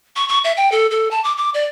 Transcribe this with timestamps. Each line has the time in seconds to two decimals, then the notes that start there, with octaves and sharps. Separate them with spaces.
0.16 C#6
0.29 C#6
0.44 E5
0.57 G5
0.72 A4
0.91 A4
1.11 A5
1.24 D6
1.37 D6
1.54 D5